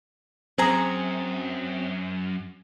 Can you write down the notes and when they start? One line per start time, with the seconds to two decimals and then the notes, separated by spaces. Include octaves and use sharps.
0.58 F#2 C4 G#4 C5 A#5 D#6